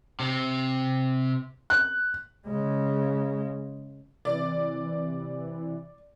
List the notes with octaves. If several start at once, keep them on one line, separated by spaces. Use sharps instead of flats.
C3
F#6
C#3 G#3
C3 E3 D5